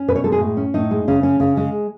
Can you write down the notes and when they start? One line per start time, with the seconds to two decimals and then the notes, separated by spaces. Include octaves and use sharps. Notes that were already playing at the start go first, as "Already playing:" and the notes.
Already playing: C#4
0.08 B2 B4
0.15 C#5
0.24 G#3 A4
0.32 G#4
0.41 A2
0.57 C#4
0.74 A2 D#4
0.91 G#3
1.08 C#3 C#4
1.23 C#4
1.40 C#3
1.57 G#3